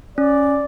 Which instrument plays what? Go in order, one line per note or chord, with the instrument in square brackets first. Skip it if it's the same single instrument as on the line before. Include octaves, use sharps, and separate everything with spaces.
[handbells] C#4 [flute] D5